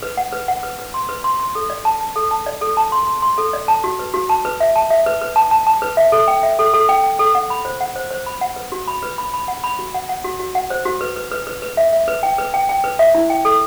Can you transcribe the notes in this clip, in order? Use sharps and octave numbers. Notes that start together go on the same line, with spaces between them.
B4
F#5
B4
F#5
B4
B4
C6
B4
C6
C6
A4
D5
A5
A5
A4
A5
D5
A4
A5
C6
C6
C6
A4
D5
A5
F#4
B4
F#4
A5
B4
E5
A5
E5
B4
B4
A5
A5
A5
B4
E5
A4
G5
E5
A4
A4
G5
G5
A4
F#5
B5
C5
F#5
C5
C5
B5
F#5
B4
F#4
B5
B4
B5
B5
F#5
B5
F#4
F#5
F#5
F#4
F#4
F#5
C5
F#4
B4
B4
B4
B4
B4
E5
E5
B4
G5
B4
G5
G5
B4
E5
E4
G5
A4